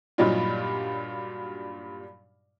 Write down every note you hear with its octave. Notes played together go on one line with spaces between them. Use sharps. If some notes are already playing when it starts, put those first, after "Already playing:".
G2 A#2 F#3 G3 D#4 F4